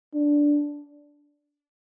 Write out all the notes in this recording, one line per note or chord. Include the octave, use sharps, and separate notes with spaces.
D4